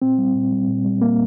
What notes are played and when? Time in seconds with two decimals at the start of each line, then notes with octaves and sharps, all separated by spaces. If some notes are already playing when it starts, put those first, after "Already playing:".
0.02 A#2 C4
0.18 G3
0.35 A#2
0.52 G3
0.68 A#2
0.85 G3
1.01 A#2 A#3